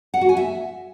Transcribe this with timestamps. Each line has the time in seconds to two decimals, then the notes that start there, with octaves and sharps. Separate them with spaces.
0.14 F#5
0.21 F#4
0.29 G#5
0.37 E5